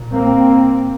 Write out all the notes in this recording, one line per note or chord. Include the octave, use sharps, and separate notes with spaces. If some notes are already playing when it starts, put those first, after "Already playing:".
Already playing: A#2
A#3 C4